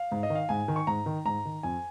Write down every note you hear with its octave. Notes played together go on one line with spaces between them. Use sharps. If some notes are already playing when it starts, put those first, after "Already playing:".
Already playing: F5
G#2
D#5
D#3
F5
G#2 G#5
D#3
C#6
G#2 A#5
D#3
G#2 A#5
D#3
F2 G#5